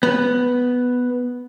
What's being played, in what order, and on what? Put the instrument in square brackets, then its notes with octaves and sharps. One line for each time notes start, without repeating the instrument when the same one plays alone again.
[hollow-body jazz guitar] B3